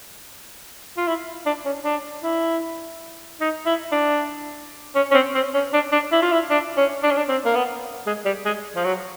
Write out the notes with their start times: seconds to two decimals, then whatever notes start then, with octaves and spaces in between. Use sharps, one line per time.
0.97 F4
1.07 E4
1.46 D4
1.65 C#4
1.84 D4
2.24 E4
3.40 D#4
3.66 E4
3.92 D4
4.95 C#4
5.11 C#4
5.14 C4
5.34 C4
5.54 C#4
5.73 D4
5.92 D4
6.12 E4
6.22 F4
6.32 E4
6.50 D4
6.77 C#4
7.03 D4
7.10 C#4
7.17 D4
7.28 C4
7.45 A#3
7.55 B3
8.06 G#3
8.25 G3
8.45 G#3
8.76 F3
8.84 F#3